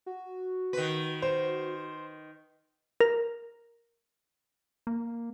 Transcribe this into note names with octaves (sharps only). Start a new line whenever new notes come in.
F#4
D#3 B4
C5
A#4
A#3